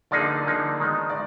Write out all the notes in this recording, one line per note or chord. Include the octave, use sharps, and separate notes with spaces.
D3 F3 A#3 D#4 G#4 D5
D3 F3 A#3 D#4 G#4
D#3 G#3 B3 D#4
D5